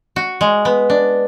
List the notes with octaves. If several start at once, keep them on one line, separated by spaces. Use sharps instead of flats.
F#4
G#3
B3
D4